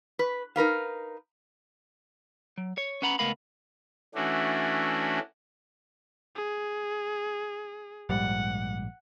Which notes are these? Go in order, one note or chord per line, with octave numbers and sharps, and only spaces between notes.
B4
D#4 A#4 B4 F5
F#3
C#5
C#4 B4 F#5 A#5 B5
C#2 A3 B3 A#4 F5 B5
E3 A3 C#4 D4 F#4
G#4
A#1 G#2 G3 F#5